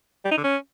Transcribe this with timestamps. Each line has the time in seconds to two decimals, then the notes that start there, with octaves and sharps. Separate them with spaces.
0.25 G3
0.31 D#4
0.37 D3
0.44 C#4